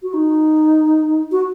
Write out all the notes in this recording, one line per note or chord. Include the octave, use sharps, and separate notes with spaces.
F#4
D#4
F#4